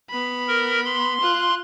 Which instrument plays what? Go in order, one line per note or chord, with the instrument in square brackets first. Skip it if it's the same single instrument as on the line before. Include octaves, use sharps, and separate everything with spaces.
[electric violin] B3 B5
[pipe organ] A#4
C6
[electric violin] F4 F#6